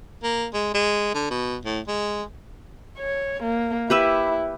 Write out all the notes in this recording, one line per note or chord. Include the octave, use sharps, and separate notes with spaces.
A#3
G#3
G#3
D3
B2
A2
G#3
C#5
A#3
E4 G4 B4 E5